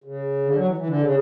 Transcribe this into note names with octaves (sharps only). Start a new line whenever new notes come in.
C#3
D3
F#3
E3
E3
D3
C#3